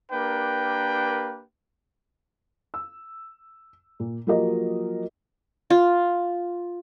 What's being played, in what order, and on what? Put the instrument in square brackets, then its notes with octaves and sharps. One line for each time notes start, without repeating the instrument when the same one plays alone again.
[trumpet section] A#3 D4 G4 A#4 B4 G5
[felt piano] E6
A#2
F3 F#3 A#3 G4 A#4 D#5
[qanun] F4